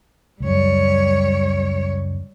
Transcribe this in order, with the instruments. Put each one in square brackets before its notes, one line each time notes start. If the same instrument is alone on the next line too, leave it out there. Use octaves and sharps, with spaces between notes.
[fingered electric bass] C#2 F#2 [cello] G3 C#5